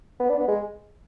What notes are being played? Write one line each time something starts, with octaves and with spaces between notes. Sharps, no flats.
B3
D4
B3
G#3